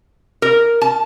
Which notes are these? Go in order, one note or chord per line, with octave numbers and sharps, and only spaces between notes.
A#4
A5